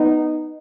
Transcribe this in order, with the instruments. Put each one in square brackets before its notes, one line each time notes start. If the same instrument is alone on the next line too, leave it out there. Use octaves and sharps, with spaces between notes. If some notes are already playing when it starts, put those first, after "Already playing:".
Already playing: [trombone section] B3 D#4